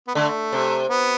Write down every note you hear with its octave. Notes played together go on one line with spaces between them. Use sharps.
B3
D3 A3
C3
B3